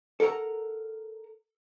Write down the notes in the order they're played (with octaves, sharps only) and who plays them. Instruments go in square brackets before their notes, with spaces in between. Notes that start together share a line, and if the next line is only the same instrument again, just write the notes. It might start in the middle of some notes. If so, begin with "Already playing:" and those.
[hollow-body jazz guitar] A4 A#4 F#5 G5 A#5